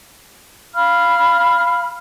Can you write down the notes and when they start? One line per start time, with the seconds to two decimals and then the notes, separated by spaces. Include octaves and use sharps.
0.75 F5 B5 F6